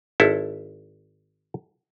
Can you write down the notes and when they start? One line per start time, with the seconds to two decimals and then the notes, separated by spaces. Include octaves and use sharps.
0.20 G#1 E4 A4